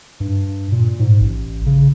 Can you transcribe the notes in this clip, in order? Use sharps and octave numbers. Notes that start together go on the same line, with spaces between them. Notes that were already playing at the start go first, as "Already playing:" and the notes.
G2
A#2
G#2
A1
C#3